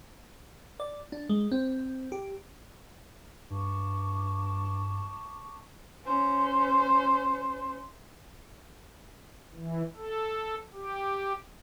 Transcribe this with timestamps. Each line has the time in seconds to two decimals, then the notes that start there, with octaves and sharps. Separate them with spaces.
0.80 D5
1.12 D4
1.29 G#3
1.52 C4
2.12 G4
3.50 G2 A5 C#6 D6
6.05 C#4 C5
9.54 E3
9.96 A4
10.73 G4